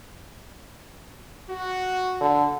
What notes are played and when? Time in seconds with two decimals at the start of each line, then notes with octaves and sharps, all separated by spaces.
1.50 F#4
2.21 D3